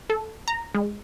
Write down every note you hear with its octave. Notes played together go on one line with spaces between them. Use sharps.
A4
A#5
G#3